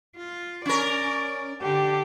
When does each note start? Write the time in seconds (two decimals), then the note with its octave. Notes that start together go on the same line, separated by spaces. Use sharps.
0.17 F4
0.66 C#4 A#4 D5
1.62 D3 G4